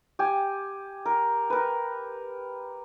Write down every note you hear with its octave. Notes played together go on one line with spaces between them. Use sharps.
G4 G#5
A#4
A#4 B4